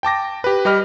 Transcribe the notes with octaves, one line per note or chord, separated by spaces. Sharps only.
G5 A5 D6 A#6
G4 B4
G3 G4 D#5 B5 F6